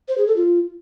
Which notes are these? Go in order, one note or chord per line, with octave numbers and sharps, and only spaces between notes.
C5
G#4
A4
F4